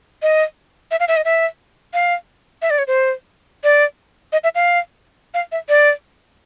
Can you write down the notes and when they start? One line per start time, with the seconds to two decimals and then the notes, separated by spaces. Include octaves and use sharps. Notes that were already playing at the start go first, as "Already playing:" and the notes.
0.22 D#5
0.91 E5
1.00 F5
1.08 E5
1.17 D#5
1.25 E5
1.94 F5
2.62 E5
2.70 D5
2.78 C#5
2.87 C5
3.64 D5
4.33 D#5
4.44 E5
4.55 F5
5.34 F5
5.52 E5
5.69 D5